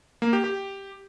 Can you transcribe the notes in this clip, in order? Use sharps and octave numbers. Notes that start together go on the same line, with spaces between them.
A#3
G4
G4